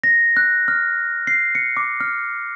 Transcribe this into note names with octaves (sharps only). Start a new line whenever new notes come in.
A#6
F#6
F6
C7
C#7
D6
F6